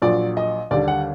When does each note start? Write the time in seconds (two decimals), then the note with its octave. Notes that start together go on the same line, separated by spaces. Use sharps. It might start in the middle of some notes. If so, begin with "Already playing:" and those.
0.02 A#1 A#2 F#3 D5
0.37 D#5
0.71 D#2 D3 G3 D5
0.88 F#5